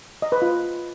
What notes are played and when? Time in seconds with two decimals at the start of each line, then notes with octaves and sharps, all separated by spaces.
0.22 D#5
0.32 B4
0.42 F4